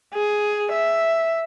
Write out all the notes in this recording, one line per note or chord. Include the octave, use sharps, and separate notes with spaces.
G#4
E5